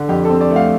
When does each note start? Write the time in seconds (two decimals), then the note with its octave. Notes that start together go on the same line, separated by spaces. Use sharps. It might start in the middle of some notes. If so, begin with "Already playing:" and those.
Already playing: D3
0.09 F2 G4
0.25 C4 A4
0.41 D5
0.51 A3
0.56 F5